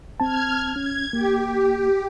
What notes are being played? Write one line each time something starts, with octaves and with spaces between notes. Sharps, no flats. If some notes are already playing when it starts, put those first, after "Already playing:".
C4 A5 F6 G#6
C#4 G#6
A#3 G4